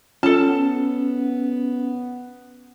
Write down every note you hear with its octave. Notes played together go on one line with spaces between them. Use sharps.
C#4 F4 A4 A5
B3